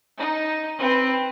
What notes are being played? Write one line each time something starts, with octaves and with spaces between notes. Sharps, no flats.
D#4
C4 B4